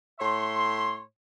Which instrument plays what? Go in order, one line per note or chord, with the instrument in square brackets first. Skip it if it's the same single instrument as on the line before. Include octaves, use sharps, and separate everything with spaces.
[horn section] A2 C#5 E5 C6